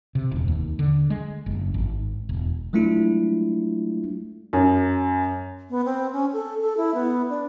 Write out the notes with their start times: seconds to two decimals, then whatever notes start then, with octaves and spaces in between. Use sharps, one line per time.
0.15 C3
0.31 E1
0.48 D#2
0.79 D3
1.10 G#3
1.46 F#1
1.74 G#1
2.29 E1
2.73 F#3 G#3 A3 D4 E4 F4
4.53 F#2
5.70 B3
5.85 C4
6.13 C#4
6.33 A4
6.61 A4
6.77 E4
6.94 B3
7.29 D4